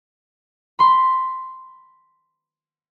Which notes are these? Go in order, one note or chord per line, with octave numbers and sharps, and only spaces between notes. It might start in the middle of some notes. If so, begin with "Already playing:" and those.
B5 C6